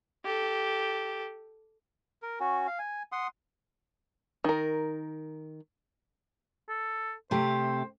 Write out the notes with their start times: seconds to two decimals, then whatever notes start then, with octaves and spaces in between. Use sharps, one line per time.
0.25 G4 A4
2.22 A#4
2.40 C#4 F#4
2.67 F5
2.79 G#5
3.12 F#5 C6 D#6
4.44 D#3 A#4
6.68 A4
7.31 C3 A3 G4 C5